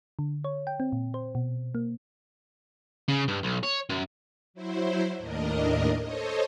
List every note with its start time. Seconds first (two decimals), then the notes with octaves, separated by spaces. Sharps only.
0.19 D3
0.44 C#5
0.67 G5
0.80 C4
0.93 A#2
1.14 C5
1.35 B2
1.75 A#3
3.08 C#3
3.28 G2
3.43 B1
3.63 C#5
3.89 F#2
4.54 F#3 E4 C5
5.18 D#2 A2 D4 A#4 D#5
6.01 A4 C5 C#5 D#5